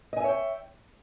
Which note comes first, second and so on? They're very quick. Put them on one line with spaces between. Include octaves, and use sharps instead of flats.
D#5 G#5 E5 C#5 G5